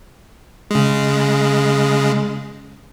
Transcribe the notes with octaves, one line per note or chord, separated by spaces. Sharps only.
C#3 G#3